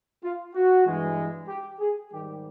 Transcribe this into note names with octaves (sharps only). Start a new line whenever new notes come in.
F4
F#4
G2 E3 G#3
G4
G#4
G#2 D#3 G3 G4